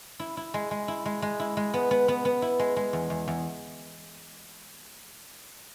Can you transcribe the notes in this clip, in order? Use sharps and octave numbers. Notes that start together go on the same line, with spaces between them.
E4
E4
G#3
G#3
E4
G#3
G#3
E4
G#3
B3
B3
B3
B3
E4
G#3
G#3
E2
E2
E2